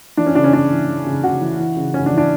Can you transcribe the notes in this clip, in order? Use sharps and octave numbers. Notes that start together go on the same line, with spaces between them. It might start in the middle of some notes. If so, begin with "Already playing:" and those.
E3 D4
C#4
C#3 D4
C#4
C#3 D4
E3
E3
C#3
C#3 F#4
E3
E3
C#3
C#3 C#4
D4
E3
D4